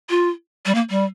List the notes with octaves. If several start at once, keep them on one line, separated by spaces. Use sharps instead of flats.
F4
G3
A#3
G3